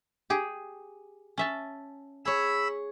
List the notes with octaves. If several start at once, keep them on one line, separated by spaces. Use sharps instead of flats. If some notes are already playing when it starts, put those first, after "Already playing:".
G4 G#4
C#4 E5 A5
G#4 C#5 B5 E6